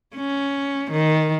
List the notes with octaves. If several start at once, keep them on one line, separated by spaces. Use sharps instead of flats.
C#4
D#3